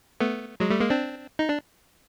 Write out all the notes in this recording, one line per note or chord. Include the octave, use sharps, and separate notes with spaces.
A3 B3
F#3 G#3
G3 A3
G#3 A#3
C4 D4
D#4
D4